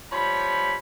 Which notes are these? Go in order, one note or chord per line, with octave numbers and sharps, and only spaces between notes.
F3 G3 C#5 B5